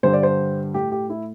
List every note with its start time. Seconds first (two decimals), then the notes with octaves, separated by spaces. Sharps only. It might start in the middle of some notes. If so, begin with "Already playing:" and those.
0.03 G2 D3 G3 C5
0.13 D5
0.23 C5
0.74 A2 A3 G4
0.92 G4
1.10 E4